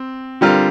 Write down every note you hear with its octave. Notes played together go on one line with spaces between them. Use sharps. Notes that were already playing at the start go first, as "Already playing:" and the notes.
Already playing: C4
D3 G3 C4 F4 A#4